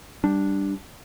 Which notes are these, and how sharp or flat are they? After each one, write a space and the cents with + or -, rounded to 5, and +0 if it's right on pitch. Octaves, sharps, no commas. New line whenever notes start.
G3 +0 D4 +0